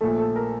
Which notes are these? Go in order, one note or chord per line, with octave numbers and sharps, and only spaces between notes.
A#1 A#2 A3 A4
A4
A#4